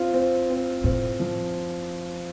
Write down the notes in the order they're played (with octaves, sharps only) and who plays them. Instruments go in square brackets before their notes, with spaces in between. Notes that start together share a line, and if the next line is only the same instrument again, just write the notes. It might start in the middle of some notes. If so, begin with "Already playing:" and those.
Already playing: [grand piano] C4 F4
C4
C4
[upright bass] A2 [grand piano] C4
[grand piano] F3